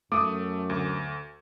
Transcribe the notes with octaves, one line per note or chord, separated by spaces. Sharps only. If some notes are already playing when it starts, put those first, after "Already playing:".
F#2 A3 D6 D#6
D2